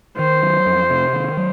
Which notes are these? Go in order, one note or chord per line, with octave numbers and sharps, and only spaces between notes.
D#3 C5
F#3
F2
C3
D#3
F#3